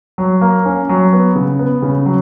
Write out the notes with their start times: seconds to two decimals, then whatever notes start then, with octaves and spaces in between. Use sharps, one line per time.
0.18 F#3
0.41 A#3
0.65 C#4
0.89 F#3
1.13 B3
1.35 C#3
1.59 B3
1.82 C#3
2.06 F#3